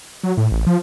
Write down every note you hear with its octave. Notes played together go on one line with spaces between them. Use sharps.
F#3
A2
A1
F3